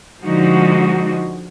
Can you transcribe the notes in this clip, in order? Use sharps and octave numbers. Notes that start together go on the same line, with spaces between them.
D3 F3 G#3 D#4 F#4